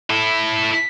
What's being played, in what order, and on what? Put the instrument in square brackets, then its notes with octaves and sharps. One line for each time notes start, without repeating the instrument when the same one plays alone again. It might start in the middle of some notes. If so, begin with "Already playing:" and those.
[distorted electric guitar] E4 A4